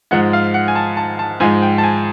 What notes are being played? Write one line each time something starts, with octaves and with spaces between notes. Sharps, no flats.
G#2 F3 G#3 F#5
F5
F#5
G#5
A5
A5
A5
G#2 F3 G#3 G#5
G5
A5
G#5